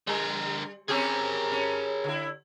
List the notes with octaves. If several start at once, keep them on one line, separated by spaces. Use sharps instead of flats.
D3 G3 A#4
C4 C#4 G4 G#4 A#4
C#4
D3 E4